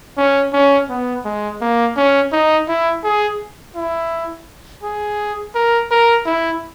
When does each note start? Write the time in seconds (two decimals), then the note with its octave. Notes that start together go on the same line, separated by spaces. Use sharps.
0.17 C#4
0.53 C#4
0.89 B3
1.25 G#3
1.61 A#3
1.96 C#4
2.32 D#4
2.68 E4
3.04 G#4
3.76 E4
4.83 G#4
5.55 A#4
5.91 A#4
6.26 E4